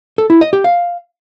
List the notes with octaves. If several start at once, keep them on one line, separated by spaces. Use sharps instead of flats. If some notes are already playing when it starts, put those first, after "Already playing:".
A4
E4
D#5
G4
F5